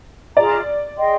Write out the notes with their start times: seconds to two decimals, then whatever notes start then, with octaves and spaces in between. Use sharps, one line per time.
0.36 F4 G#4 D5 D#5 A#5
0.97 G#4 D#5 G5 C6